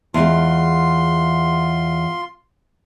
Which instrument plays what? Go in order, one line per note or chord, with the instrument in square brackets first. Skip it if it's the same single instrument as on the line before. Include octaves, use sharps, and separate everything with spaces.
[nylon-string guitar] E2 G#3 [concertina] F4 C6